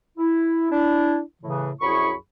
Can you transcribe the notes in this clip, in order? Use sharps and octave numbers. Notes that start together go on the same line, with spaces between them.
E4
D4 E4
A2 C#3 E3
C2 F#2 E4 G#4 B5 C#6